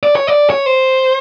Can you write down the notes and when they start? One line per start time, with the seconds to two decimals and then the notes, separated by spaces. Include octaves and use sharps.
0.03 D5
0.16 C#5
0.27 D5
0.50 C#5
0.66 C5